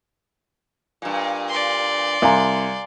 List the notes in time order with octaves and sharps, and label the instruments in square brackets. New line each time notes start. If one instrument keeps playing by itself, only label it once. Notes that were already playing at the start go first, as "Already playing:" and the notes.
[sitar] G2 A#2
[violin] D5 C6
[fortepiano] C2 [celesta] F5 G#5 A#5